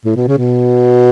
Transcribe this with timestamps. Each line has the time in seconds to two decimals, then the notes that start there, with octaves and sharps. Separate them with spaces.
0.05 A2
0.16 B2
0.28 C#3
0.38 B2